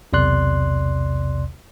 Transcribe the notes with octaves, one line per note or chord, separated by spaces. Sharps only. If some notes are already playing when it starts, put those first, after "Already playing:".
B1 E2 C3 D5 C6 F#6